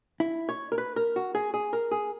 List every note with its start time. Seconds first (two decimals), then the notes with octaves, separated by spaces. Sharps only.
0.20 E4
0.49 C#5
0.72 A#4
0.78 B4
0.96 A#4
1.16 F#4
1.35 G#4
1.54 G#4
1.73 A#4
1.91 G#4